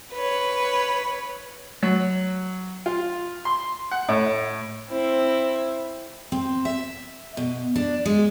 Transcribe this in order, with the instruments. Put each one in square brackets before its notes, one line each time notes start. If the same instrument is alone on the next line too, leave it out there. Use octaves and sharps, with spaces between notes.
[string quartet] B4 C#5
[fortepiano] F#3
F4
C6
F#5
A2
[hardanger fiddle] C4 E4
[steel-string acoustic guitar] C4
E5
B2
D4
G#3